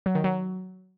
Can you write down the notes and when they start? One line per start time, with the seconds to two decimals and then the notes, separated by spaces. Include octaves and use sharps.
0.06 F#3
0.15 D#3
0.24 F#3